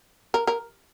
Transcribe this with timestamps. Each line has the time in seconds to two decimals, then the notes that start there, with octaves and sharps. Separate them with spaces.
0.34 A#4
0.47 A#4